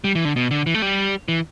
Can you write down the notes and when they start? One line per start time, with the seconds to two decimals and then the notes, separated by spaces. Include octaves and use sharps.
0.04 G3
0.15 E3
0.25 D3
0.36 B2
0.51 D3
0.67 E3
0.74 A3
0.82 G3
1.28 E3